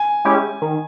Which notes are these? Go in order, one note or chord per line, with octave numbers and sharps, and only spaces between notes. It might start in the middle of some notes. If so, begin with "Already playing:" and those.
Already playing: G#5
G#3 C#4 E4 G4
D#3